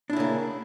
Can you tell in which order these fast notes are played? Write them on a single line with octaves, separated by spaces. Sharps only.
D4 E4 C#3 A#3